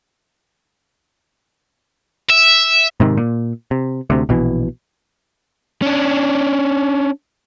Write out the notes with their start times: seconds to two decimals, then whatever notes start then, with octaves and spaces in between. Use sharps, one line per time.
2.30 E5
3.00 G#2 C3 D#3
3.17 A#2
3.71 C3
4.10 D2 C3
4.29 A#1 B2 E3
5.82 C#4 D4